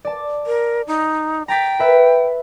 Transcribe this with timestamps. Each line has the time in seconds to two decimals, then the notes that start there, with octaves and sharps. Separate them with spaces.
0.05 D5 A5
0.46 A#4
0.87 D#4
1.48 G5 A#5 A6 B6
1.79 B4 E5 B6